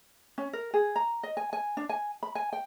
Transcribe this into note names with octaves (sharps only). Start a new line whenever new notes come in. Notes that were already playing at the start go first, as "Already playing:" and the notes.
C#4
A#4
G#4
A#5
D#5
G#5
G#5
D4
G#5
B5
G#5
G5